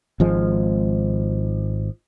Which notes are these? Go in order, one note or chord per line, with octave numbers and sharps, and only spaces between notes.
G#1 F3 G#3